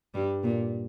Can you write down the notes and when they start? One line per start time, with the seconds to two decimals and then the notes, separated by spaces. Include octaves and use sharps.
0.14 G2 G3
0.43 A#2